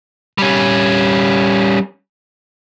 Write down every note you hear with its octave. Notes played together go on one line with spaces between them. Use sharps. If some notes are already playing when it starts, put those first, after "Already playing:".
G3 C#4